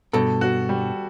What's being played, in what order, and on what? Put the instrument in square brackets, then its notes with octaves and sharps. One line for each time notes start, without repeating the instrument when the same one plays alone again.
[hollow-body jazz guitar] G2 B2 [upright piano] A4
[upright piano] F#4
G3